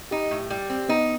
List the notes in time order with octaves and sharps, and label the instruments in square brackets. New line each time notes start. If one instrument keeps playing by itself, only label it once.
[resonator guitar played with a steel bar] D#4 [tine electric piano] G4
[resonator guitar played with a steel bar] A2
[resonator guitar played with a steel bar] G3 [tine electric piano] G4
[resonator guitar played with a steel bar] C4
[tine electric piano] B3 [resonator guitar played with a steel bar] D#4